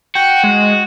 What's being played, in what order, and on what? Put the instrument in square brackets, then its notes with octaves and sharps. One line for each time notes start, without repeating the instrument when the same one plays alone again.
[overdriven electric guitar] F#4 [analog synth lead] G5
[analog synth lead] G#3